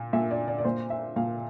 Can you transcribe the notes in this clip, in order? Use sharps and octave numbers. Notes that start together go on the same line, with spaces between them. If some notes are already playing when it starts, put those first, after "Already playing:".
Already playing: A#2
A#2 E5
D5
D5
D5
A#2 C5
E5
A#2 F5